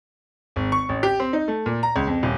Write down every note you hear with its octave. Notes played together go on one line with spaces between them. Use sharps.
G#1
C#6
A1
G4
C4
D#4
A3
A#2
A#5
C#2
F2
D#1